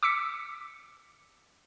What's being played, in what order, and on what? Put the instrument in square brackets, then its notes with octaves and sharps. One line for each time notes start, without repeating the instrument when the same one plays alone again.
[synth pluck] D6 E6 B6 C#7